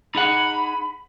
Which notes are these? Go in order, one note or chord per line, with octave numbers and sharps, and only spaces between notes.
D#4 G#4 F#5 B5